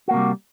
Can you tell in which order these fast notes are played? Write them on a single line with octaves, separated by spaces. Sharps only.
F#4 A#3 C3 G3